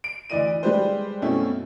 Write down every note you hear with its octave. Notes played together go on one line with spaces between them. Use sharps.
D7
D2 E3 D5 D#5 D#7
G3 G#3 G4 B4 C5
F#2 B2 A3 C4 C#4 E4